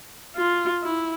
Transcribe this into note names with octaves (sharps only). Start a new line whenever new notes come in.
F4
E4